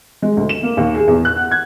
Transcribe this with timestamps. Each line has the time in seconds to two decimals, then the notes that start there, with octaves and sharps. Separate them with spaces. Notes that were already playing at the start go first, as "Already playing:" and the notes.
0.22 G#3
0.37 D2
0.49 E7
0.63 A#3
0.77 D#2
0.95 G#4
1.08 E2
1.25 F#6
1.36 F#5
1.51 G#6